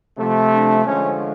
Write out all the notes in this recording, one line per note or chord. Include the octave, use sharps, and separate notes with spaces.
C3 F3 A3
D4
D3 F3 G#3 C#4